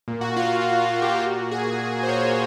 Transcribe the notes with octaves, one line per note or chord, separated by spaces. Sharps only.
A#2
F#4
A#2 F4
A#2
A#2 F#4
G4
F#4
A#2
A#2 G#4
A#2
C5
A#2 C#5